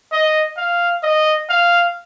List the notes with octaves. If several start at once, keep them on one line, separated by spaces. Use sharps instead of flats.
D#5
F5
D#5
F5